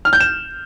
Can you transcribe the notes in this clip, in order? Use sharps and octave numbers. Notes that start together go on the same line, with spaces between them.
F6
G6
E7